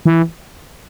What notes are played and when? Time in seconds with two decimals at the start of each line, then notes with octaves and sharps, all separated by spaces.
0.06 E3